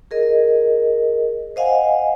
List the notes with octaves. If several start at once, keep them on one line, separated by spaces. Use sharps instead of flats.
G#4 A#4 D#5
C5 D#5 F5 F#5 G#5